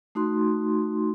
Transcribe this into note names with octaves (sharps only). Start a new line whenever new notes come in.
A3 D#4 F#4 C6